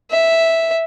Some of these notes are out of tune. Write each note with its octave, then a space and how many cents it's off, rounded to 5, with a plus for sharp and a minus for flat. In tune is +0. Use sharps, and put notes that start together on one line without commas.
E5 -5